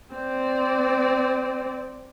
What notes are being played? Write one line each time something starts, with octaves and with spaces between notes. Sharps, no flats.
C4 D5